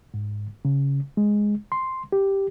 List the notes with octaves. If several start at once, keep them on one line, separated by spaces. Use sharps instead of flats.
G#2
C#3
G#3
C6
G4